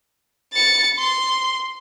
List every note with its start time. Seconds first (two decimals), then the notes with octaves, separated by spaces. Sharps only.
0.53 A6 C#7
0.97 C6